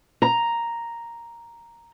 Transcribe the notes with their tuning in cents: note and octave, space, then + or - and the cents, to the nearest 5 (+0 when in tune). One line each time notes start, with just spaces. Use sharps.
A#5 +0